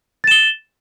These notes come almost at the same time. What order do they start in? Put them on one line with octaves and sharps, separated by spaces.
A6 E7 G7